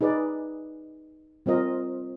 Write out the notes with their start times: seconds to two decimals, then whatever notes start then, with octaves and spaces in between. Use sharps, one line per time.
0.01 D#4 G#4 B4 D5
1.46 G3 C4 F4 A#4 D#5